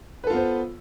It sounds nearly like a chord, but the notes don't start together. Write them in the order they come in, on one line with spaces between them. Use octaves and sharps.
B4 A4 F4 B3 C5